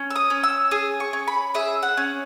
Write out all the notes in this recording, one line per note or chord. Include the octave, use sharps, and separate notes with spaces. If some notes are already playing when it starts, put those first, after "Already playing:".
Already playing: C#4
E6
D#6
C#4
E6
G#4 D#6
C#6
C#4
B5
G#4 E5
F#5
C#4